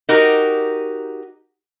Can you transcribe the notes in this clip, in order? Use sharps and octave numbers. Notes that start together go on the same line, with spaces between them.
D#4 F#4 G4 A#4